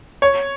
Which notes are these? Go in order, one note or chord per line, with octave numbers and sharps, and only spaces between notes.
C#5